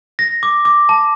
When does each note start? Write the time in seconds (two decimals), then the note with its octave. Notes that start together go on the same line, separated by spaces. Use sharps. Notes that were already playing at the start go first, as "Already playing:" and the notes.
0.19 A#6
0.43 D6
0.65 D6
0.89 A5